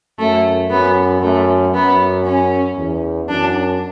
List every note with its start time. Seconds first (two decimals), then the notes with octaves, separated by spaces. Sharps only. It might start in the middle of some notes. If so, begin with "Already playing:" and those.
0.18 F#2 A3
0.70 F#2 B3
1.22 F#2 A3
1.73 F#2 B3
2.26 C#4
2.77 E2
3.29 F#2 D4